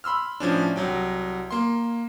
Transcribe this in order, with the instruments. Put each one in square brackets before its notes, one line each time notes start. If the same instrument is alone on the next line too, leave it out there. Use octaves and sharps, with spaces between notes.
[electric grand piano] B5 C6 E6 F6
A2 F3 C#4 D4
C2 F#3 G5
A#3 C6